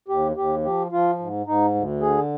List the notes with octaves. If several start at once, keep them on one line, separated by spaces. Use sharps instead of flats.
D#2 G4
D#2 G4
F3 G4
F3 F4
G#2
G#2 D#4
D2
D3 G#4